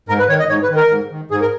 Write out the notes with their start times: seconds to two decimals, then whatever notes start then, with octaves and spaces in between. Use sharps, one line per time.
0.09 G#2 A#4
0.19 B4
0.29 D#3 C#5
0.39 D#5
0.49 G#2 C#5
0.63 B4
0.70 D#3
0.76 A#4
0.90 G#2
1.11 D#3
1.31 G#2 G#4
1.41 A#4